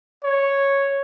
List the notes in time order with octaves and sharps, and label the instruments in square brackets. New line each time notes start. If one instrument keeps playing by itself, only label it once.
[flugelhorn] C#5